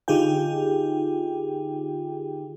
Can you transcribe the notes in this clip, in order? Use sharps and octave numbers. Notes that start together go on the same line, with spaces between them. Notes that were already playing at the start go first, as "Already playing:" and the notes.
D3 D#4 F4 G4 G#4 G5